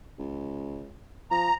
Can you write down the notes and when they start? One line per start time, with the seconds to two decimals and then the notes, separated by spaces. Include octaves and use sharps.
0.19 C#2
1.31 F3 A#5